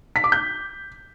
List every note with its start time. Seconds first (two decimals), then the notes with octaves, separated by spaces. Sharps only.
0.16 B6
0.24 D6
0.32 G6